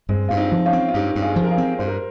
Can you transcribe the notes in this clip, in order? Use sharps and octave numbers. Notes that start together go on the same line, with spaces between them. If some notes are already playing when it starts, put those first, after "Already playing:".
G2 G#3 C4
G2 F4
C4 D#4
F3
C#4 F4
C4
F4
G2 D#4 G4
G2
F4 G#4
F3
A#4
F4 G#4
C4
G2 C5
A#4